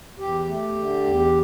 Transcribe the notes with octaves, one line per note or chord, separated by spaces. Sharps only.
E2 G4
A3
D3
E2